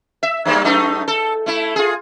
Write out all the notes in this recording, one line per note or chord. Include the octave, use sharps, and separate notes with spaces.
E5
G2 G3 A#3
F#2 A3 D#4
A4
A3 E4
F4 G#4